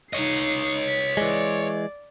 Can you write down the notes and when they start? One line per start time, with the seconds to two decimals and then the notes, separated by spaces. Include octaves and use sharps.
0.13 D#4 C#5 D#5 C7
0.89 B6
1.17 E3 G#3 D5